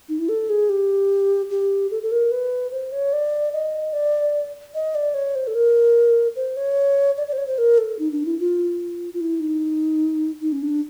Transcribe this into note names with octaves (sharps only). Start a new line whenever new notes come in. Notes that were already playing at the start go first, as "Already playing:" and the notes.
D#4
E4
A4
G#4
G4
G4
A4
A4
A#4
B4
C5
C#5
D5
D#5
D5
D#5
D5
C#5
C5
A4
A#4
C5
C#5
D5
D5
C5
C#5
C5
A#4
A4
D#4
D4
E4
F4
F4
E4
D#4
D#4
C#4
D4